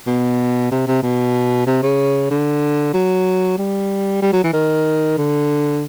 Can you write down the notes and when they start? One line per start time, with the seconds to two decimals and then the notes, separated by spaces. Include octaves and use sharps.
0.07 B2
0.71 C3
0.87 C3
1.03 B2
1.66 C3
1.82 C#3
2.31 D3
2.94 F#3
3.58 G3
4.22 G3
4.33 F#3
4.44 E3
4.53 D#3
5.18 D3